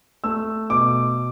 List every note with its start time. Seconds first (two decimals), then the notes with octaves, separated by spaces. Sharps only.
0.24 A3 E6
0.70 B2 D6